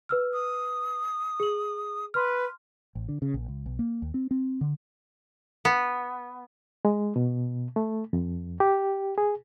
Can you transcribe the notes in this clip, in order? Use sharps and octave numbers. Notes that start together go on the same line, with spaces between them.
B4 E6 F6
D#6
G#4 F#7
B4 C6 F6
A1
D3
C#3
A#1
C#2
B1
A#3
D#2
C4
C4
D3
B3
G#3
B2
A3
F2
G4
G#4